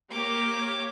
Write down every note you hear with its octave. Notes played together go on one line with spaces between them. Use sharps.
A#3 G4 C#5 D6